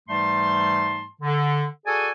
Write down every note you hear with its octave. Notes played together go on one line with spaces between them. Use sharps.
G#2 E3 G3 A3 A5 C6
D3
F#4 G#4 A4 D5 G#5